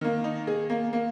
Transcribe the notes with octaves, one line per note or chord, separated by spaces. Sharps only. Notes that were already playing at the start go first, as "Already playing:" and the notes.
D#3 A#3
D#4
G#4
A#3
A#3